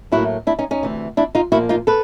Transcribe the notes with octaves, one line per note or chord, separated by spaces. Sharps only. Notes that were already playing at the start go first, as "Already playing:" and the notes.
A2 F#3 A#3 E4 F#4
D4 E4
C#4 D#4
C#4 D#4
D2 C3 E3
D4 E4
D#4 F4
A#2 F3 A#3 E4 F#4
D#4 F4
A4 B4